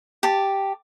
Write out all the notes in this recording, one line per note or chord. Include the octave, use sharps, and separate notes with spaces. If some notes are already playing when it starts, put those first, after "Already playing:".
G4 A5